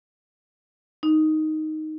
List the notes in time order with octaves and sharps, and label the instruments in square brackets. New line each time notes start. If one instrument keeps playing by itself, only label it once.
[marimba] D#4